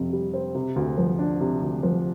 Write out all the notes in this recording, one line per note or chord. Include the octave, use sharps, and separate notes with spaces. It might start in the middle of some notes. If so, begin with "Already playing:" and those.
Already playing: F2 C3
G3
C4
C3
D2
F3
D4
C3
D2
F3